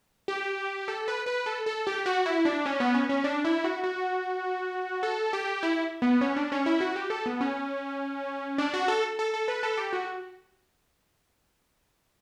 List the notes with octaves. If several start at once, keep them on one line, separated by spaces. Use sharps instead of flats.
G4
A4
B4
B4
A4
A4
G4
F#4
E4
D4
C#4
B3
C#4
C#4
D4
E4
F#4
F#4
A4
G4
E4
B3
C#4
D4
C#4
E4
F#4
G4
A4
B3
C#4
D4
F#4
A4
A4
A4
B4
A4
G4
F#4